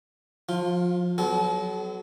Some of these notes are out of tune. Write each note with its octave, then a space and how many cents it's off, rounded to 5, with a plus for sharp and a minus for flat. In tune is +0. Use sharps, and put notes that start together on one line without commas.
F3 +25 F4 +0
F#3 +20 B3 +45 A4 -35